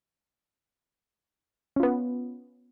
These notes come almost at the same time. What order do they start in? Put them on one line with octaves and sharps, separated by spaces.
C#4 F4 B3